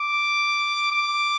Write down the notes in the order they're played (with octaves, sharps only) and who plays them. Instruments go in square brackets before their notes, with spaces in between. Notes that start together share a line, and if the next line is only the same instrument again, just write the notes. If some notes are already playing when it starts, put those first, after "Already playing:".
Already playing: [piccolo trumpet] D6
D6